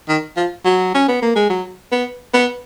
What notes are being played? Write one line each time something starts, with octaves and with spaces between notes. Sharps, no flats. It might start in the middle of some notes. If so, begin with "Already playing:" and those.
D#3
F3
F#3
C#4
B3
A#3
G#3
F#3
B3
B3